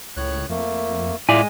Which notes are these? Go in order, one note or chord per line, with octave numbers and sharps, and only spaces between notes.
C#2 A2 C#5 F#6
F2 A3 A#3
A2 G#3 E4 F4 D5 G#5